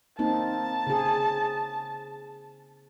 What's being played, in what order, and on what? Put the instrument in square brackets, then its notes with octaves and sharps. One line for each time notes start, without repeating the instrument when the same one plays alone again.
[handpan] A#3 C4 D#4 [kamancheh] A5
[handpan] C#3 G#4